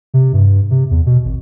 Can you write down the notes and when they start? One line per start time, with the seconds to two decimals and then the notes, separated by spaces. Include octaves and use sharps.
0.14 C3
0.33 G2
0.71 C3
0.90 E2
1.06 B2
1.24 G#1